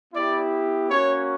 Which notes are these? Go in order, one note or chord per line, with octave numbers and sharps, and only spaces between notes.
B3 E4 G4 D5
A#3 C#4 F#4 C#5